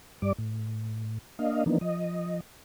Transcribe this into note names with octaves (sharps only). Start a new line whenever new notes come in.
G2 G3 D5 D6
A2
A#3 D4 D#5 F5
E3 F3 A#3 B3 D4 D#4
F3 D#5